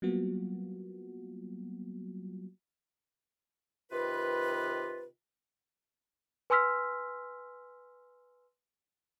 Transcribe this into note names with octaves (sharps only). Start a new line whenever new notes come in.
F#3 G3 A#3 B3 F4 F#4
C3 D#3 F4 B4
B4 G#5 C6 E6 F6 B6